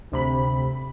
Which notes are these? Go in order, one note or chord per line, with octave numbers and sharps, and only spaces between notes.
D2 C3 B5